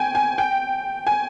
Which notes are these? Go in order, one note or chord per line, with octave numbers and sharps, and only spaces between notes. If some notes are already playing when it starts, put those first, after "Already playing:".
Already playing: G5 G#5
G#5
G5
G#5